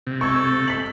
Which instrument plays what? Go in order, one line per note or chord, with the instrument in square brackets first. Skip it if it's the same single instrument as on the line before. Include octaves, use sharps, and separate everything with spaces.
[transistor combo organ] C3
[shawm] A4 [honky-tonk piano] C#6 G#6
[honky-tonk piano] B6 F#7